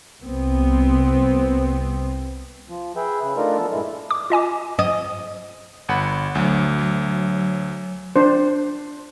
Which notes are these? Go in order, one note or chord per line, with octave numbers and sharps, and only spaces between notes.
C2 B3 C4
F3
G#4 B4 E5 G5
C#3 B4
A3 D4 D#4 F4 A#4
F3 B3 A4
G2 A#2 G#3 E4
D6
F4 D#5 G#5 D6
D#5
G1 F#5 B5
D2 F#3
F#3
D4 C5